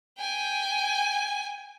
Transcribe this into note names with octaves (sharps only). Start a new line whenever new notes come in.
G5 G#5